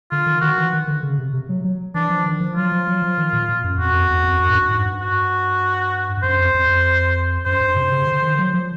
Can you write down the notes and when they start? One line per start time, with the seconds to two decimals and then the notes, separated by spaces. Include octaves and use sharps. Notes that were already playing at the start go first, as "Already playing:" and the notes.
0.11 D3 F4
0.27 D#3
0.41 D#3 F#4
0.58 E3
0.73 D#3
0.87 D3
1.03 C#3
1.18 C3
1.33 C3
1.49 F#3
1.64 F#3
1.94 E3 D4
2.10 F3
2.26 D#3
2.41 F3
2.56 F#3 F4
2.72 F3
2.87 F#3
3.02 F3
3.17 D#3
3.33 A#2
3.49 A#2
3.64 F#2
3.78 F2 F#4
3.93 F2
4.10 E2
4.24 F2
4.39 F#2
4.50 G#2
4.55 G2
4.71 G#2
4.85 G2
5.01 F#4
6.17 G2
6.23 F#2 C5
6.39 F2
6.54 F2
6.69 F2
7.46 F#2 C5
7.61 G2
7.76 C3
7.91 C#3
8.07 D3
8.22 D#3
8.38 F#3
8.54 F3